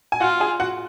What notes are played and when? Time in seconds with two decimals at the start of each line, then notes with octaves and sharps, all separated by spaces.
0.12 G#5
0.20 F4 F#4 F#5
0.40 G#4 G#5
0.60 F#4 F#5